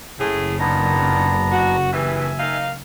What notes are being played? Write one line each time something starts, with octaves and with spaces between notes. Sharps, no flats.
F#1 A2 G#4
A#2 D#3 B3 D4 A#5
F#4
G2 E3 E5 G#5
D#3 D#4 F5